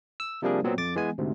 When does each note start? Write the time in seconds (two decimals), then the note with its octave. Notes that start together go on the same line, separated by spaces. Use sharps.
0.20 E6
0.42 C3 F3 G3 A#3 D4 G#4
0.64 A#2 F#3 B3 C4
0.78 F2 D6 A6
0.96 E3 G#3 B3 G#5
1.18 D2 G#2 C3